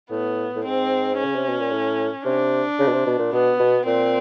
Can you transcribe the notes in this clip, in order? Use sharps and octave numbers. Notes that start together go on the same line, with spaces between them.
A2 B3
A2
G#2 C4
C#4
C#3
C3
B2
A#2
A2
C3 D4
C#3
B2
C3
B2
A#2
B2 B3
B2
A#2 C4